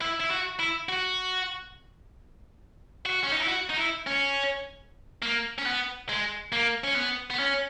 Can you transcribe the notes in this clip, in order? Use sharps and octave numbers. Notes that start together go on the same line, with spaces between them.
E4
E4
F#4
E4
F#4
F#4
C#4
D#4
E4
F#4
D#4
E4
C#4
A#3
C#4
B3
G#3
A#3
C#4
B3
B3
C#4